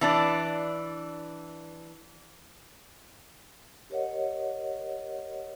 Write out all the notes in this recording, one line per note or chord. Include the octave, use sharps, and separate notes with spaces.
E3 D4 D5
G4 A#4 C#5 D#5 F#5